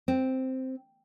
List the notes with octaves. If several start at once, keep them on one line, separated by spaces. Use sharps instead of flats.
C4